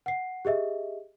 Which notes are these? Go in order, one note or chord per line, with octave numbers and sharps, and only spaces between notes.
F#5 C7
G4 G#4 D#5 E5